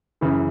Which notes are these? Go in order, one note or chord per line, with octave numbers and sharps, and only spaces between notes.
F#2 C#3 E3